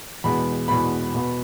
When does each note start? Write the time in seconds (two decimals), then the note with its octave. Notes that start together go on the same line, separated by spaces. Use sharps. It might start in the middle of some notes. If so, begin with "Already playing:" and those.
0.24 E2 B2 G#3 B3 B5
0.68 E2 B2 G#3 B3 B5
1.14 B2 B3